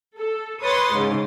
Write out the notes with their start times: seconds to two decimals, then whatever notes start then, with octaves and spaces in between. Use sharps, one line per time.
0.18 A4
0.62 B4 C#5 C6 D#6 A6
0.92 G#2 C#3